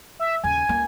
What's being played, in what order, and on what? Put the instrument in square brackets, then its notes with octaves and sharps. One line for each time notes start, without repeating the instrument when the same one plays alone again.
[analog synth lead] E5
[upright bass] D#2 C#3 [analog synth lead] G#5
[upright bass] C#2 A#3